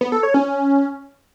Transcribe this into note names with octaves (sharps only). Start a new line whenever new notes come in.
B3
A4
C#5
C#4
C#4